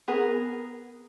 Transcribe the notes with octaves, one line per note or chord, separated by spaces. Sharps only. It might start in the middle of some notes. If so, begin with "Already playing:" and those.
B3 G#4 A#4